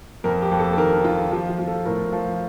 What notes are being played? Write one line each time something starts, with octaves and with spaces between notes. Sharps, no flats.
F2 A#4
G4
F2
A4
A4
D#3 A#4
D#3 F4
F3 G4
F4
F3
A4
A2 A#4
F3